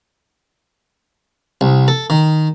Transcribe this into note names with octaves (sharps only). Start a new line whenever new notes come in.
C2
A4
D#3